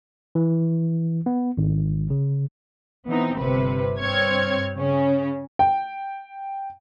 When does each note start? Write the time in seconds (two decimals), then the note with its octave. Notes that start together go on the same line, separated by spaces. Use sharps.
0.35 E3
1.26 B3
1.57 G#1
2.10 C#3
3.06 E3 B3 C4 D#4
3.37 G1 C3 B4
4.01 G2 C4 C#5 F6 G#6 C#7
4.78 C#3 C#4
5.59 G5